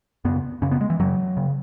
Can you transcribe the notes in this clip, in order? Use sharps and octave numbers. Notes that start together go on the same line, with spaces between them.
F#2 C#3 B3
F#2 C#3 C#4
B3
G#3
E3
F#2 C#3 F#3
C#3